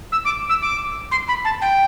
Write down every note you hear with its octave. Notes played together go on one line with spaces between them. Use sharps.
E6
D6
E6
D6
C6
B5
A5
G5